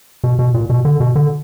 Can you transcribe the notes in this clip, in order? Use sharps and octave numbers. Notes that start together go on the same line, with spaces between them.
B2
B2
A#2
B2
D3
B2
D3